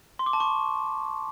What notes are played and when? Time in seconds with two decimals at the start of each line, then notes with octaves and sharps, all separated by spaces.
0.19 C6
0.26 D6
0.33 A5
0.40 C#6